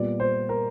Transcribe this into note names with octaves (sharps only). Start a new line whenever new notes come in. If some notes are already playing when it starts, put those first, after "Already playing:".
Already playing: A#2 G3 B3 D5
C5
A#4